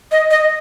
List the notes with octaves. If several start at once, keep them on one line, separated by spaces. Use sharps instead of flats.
D#5
D#5